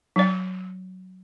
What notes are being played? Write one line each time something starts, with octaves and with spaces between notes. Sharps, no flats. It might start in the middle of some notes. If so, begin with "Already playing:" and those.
F#3 D5